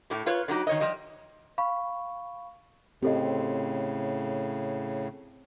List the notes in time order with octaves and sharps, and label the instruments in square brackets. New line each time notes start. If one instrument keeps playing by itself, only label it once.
[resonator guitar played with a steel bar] A2 G4
F4 B4 C#5
D3 F#3 D#4 G4
D#3 C#5 D#5
F3 G3 D#5
[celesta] F5 B5 C#6
[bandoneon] A2 C#3 [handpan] C4 [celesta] G4 A4 D#5